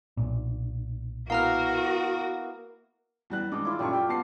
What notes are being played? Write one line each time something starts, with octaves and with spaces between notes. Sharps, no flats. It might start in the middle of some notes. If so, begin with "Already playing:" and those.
B1 A#2
A#3 B3 E4 F#4 A#4 F5 A#5 F6
E2 G3 F#6
G2 D#3 G#3 D5 D#5
E4 F4 D5
D#1 F#2 G3 A3 F4 C#6
G4
B3 A5 C7